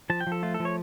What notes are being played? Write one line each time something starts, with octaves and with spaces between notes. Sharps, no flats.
F3 A5
G5
F3
A4
A3 F4
A4
F3
C#5